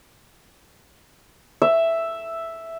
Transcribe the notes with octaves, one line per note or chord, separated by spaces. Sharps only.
E5